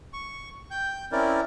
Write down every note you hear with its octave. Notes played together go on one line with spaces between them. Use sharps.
C#6
G5 G6
C4 C#4 E4 A#4 D5